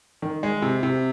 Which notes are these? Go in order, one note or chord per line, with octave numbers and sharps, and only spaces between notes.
D#3
G#3
C3
C3